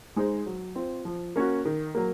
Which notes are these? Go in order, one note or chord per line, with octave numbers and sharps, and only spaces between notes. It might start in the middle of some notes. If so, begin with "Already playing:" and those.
G#3 D#4 G#4 C5
F#3
C4 F4
F3
A#3 C#4 F#4
D#3
F#3 A#3